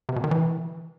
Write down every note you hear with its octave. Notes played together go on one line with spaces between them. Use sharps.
C3
B2
D#3
E3